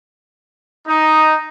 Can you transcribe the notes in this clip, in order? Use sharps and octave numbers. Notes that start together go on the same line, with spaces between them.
D#4